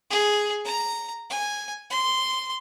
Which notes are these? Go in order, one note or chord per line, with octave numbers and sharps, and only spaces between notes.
G#4
A#5
G#5
C6